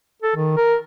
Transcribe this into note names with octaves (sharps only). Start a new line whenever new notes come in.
A4
D#3
A#4